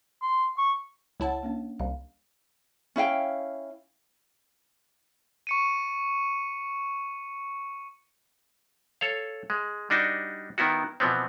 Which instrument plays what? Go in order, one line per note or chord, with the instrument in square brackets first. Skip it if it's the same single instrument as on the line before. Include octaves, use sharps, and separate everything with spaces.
[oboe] C6
C#6
[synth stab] C#2 E4 A5 [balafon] C#5 F#5
[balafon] A#3 C#4 D4
[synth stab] C2 [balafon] F5
[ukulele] C#4 E4 F5 G5
[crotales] C#6 C#7 D#7
[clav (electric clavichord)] A4 C#5 F5
G#3
G3 D4 D#4 F#4
D#3 B3 E4 F#4
B2 E3 F3 B3 C4